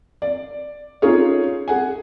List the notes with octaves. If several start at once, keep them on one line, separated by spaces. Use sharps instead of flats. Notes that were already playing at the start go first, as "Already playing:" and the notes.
D5
C#4 D#4 F4 G#4 C#5
G#4 F#5 G#5